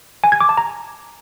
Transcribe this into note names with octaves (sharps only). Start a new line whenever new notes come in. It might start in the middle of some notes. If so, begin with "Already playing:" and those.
G#5
G#6
D6
A5
A#5